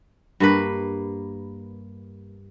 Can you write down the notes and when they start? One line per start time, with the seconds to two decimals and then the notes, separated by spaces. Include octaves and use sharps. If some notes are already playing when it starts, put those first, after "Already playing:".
0.40 G2 A#3 B4